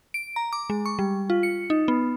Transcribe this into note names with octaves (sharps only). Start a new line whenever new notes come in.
D7
A#5
D6
G#3
C#6
G3
F4
C#7
D#4
B3